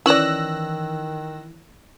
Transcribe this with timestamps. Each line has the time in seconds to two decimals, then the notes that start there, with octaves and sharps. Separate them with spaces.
0.06 D#3 E3 C#4 D5 E6 F#6 A#6